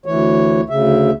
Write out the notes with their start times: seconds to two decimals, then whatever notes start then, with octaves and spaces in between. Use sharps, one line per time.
0.06 D2 E3 C#5
0.70 D2 C#3 E5